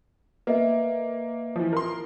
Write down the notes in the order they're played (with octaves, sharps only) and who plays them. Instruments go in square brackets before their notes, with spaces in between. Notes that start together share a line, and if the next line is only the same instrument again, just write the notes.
[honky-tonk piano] A#3 [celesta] B4 D#5 E5
[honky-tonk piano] E3 F3
A#4 C6